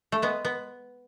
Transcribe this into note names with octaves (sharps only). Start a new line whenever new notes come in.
A3
G#3 B3
B3